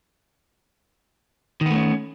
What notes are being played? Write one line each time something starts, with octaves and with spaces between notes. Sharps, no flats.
D#3 A3 B3 C#4